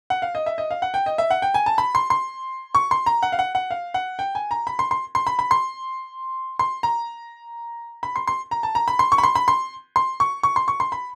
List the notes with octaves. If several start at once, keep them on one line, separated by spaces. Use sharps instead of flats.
F#5
F5
D#5
E5
D#5
F5
F#5
G5
D#5
E5
F#5
G5
G#5
A5
B5
C6
C6
C#6
C6
A#5
F#5
F5
F#5
F#5
F5
F#5
G5
G#5
A#5
B5
C6
C6
C6
B5
B5
C6
C6
A#5
B5
C6
C6
A#5
A5
A#5
B5
C6
C#6
B5
C6
B5
C6
C6
C#6
C#6
C6
C#6
C6
B5